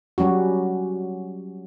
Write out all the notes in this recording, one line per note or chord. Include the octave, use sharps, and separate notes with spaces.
F#3 G3 C#4 F#4